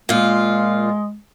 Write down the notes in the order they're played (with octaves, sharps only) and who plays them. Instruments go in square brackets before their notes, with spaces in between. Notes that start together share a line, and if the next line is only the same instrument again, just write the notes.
[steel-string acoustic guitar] A#2 F4 [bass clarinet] G#3